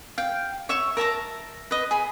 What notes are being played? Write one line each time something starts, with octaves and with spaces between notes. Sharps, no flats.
F5 G5
C#5 E5 C#6
A#4 E5 A5 A#5
B4 D#5
G#4 B5